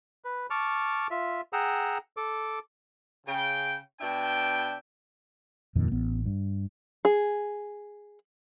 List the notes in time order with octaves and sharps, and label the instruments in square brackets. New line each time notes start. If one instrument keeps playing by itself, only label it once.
[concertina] B4
A5 C#6 D6 F6
F4 E5
G#4 F#5 G5 A#5 E6
A4 D6
[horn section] C#3 G5
B2 D4 E5 G5
[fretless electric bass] D#1 F2 A#2 D#3
A1 B3
G2
[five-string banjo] G#4